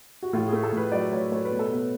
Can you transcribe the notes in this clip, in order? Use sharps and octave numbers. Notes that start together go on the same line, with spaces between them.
F#4
A2 F4
G#4
A3
A4
A2 B4
F#3 D5
A2 C#5
A3 C#5
B4
B2
A4
B3 B4